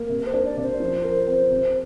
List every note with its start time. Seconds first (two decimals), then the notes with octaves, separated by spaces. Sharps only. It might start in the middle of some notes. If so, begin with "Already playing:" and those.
Already playing: A#3
0.09 C3
0.19 A#4
0.27 C5
0.33 D4
0.45 D5
0.57 C3
0.63 C5
0.80 F3
1.04 A#4
1.27 C4
1.51 C3